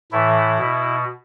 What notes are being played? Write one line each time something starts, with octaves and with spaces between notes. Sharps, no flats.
A2 E3 E4
B2